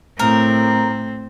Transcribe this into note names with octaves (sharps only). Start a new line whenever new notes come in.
A2 C4 A#4